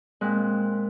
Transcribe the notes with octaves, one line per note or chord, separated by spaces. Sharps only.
A#2 G#3 C4 F#6